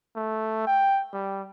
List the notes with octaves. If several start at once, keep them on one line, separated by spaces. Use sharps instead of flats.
A3
G5
G3